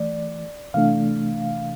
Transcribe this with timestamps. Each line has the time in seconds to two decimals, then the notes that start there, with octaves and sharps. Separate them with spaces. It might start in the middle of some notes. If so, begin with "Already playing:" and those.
Already playing: E3 A3 D5
0.74 C3 E3 A3 D4 F5